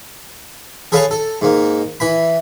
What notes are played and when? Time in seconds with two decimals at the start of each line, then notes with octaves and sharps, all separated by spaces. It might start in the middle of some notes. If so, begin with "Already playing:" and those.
0.92 G#4 A4 B4 C#5 F5 A5
1.11 A4
1.41 G#2 A#3
2.00 E3 B5